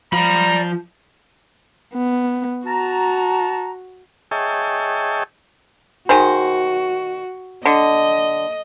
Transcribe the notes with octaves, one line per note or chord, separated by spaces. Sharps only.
F3 F4 D5 A#5 B5
B3
F#4 A5 A#5
G#4 C#5 D#5 E5 G5 A5
D#3 F#4 G#4 C5
D3 D#5